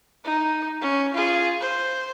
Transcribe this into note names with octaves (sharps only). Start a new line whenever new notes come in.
D#4
C#4
F4 G#4
C5